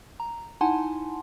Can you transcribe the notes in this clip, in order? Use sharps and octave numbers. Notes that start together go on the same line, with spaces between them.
A#5
D#4 E4 F#5 G#5 A5 C6